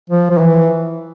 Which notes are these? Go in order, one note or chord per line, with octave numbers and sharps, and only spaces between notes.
F3
F3
E3